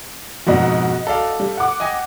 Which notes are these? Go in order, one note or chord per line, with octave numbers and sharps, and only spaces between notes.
F2 G#2 B2 F#4 D#5
A4 D5 F5
G3
F#5 D6
D#5 G5 G#5